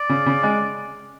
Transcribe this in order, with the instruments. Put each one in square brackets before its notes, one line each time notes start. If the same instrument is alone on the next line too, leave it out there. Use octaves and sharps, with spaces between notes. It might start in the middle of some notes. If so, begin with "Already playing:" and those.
Already playing: [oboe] D5
[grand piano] C#3
C#3
G#3